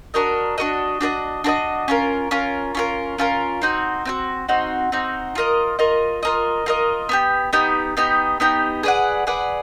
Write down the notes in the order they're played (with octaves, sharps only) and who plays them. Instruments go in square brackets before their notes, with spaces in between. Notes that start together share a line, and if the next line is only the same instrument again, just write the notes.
[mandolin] D4 F#4 A#4 D#5
D4 F#4 A#4 D#5
D4 F#4 A#4 D#5
D4 F#4 A#4 D#5
C#4 F4 A#4
C#4 F4 A#4
C#4 F4 A#4
C#4 F4 A#4
C4 D#4 F#4
C4 D#4 F#4
C4 D#4 F#4
C4 D#4 F#4
F4 A#4 D#5
F4 A#4 D#5
F4 A#4 D#5
F4 A#4 D#5
B3 D#4 G4
B3 D#4 G4
B3 D#4 G4
B3 D#4 G4
G#4 B4 D5 F#5
G#4 B4 D5 F#5